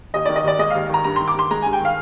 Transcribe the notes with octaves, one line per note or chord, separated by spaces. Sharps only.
D#2 D#5
D#3 D5
D#5
D#2 D5
G#3 D#5
D#2 F5
D#3 A#5
G2 A#5
D#3 C6
D6
G2 C6
G#3 A#5
G2 G#5
G5
D#3 F5